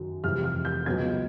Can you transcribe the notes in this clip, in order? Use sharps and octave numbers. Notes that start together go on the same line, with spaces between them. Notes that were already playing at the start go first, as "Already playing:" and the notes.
Already playing: F#2 D#3 F#3
F1 F2 C3 E3 G3 F6
F6
G6
C#2 B2 F#3 B3 G#6